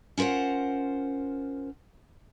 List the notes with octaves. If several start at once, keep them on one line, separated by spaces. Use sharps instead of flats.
C#4 F4 A#4 C5 F#5